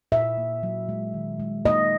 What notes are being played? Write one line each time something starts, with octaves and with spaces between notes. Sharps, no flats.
A#2 E5
A#3
F#3
G#3
D#3
G#3
A#3 D#5